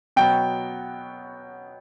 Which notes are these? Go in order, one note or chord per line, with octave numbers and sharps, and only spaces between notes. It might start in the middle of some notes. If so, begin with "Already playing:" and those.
B2 F#3 B3 G5